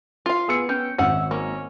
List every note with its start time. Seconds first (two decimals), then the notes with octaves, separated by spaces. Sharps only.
0.26 F4 F5
0.48 B3 G#4 E6 C#7
0.69 C#4 G5
0.98 G#1 C#4 E5 F#5
1.31 A#3 C#4